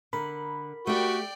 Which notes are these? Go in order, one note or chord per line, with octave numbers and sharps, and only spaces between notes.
D3 A#4 B5
A3 F#4 G4 D5 G5